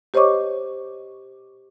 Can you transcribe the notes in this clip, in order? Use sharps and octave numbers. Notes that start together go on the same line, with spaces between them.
G4 C5 C#5 D#5 C#6 D6